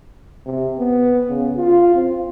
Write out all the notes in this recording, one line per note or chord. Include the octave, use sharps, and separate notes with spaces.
C3
B3
C#3
F4
C4